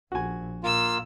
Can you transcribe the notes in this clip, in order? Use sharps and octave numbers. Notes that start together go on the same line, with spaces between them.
A#1 F#4 G#5
A#2 A#3 F4 E6